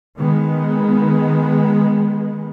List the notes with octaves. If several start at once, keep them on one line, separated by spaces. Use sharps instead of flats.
D#3 G#3 B3